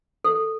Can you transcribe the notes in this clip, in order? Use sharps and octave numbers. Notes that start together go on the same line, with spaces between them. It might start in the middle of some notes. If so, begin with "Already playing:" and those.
A4